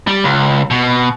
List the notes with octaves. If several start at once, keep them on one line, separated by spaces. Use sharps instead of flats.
G3
C#2
B2